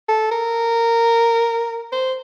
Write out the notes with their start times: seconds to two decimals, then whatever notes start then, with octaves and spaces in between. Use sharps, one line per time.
0.09 A4
0.31 A#4
1.92 C5